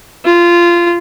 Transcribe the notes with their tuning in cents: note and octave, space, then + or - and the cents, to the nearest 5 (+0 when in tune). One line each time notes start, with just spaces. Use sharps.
F4 -15